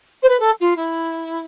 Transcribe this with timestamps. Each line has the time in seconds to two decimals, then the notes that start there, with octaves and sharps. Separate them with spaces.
0.23 C5
0.29 B4
0.39 A4
0.60 F4
0.76 E4